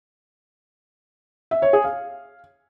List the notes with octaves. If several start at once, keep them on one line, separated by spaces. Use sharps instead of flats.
E5
C#5
G#4
F5